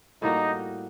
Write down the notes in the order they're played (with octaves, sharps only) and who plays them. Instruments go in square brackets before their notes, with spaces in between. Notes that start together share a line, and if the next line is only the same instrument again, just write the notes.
[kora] A2 G3 A#3 F#4 [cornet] D#4